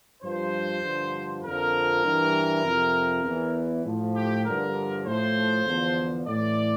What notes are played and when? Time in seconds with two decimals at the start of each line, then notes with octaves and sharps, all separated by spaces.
0.23 G2 F3 C5
0.83 G2 D3 F3
1.43 F2 D3 F3 A#4
2.04 G2 E3
2.64 F2 C3 F3
3.25 E2 E3
3.85 A2 F3
4.15 G4
4.45 G2 D3 F3 A#4
5.05 A2 F3 C5
5.66 E2 D3 F3
6.26 A2 E3 D5